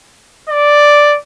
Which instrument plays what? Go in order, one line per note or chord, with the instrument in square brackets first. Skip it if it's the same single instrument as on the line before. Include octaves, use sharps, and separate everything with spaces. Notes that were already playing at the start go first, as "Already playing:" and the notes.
[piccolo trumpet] D5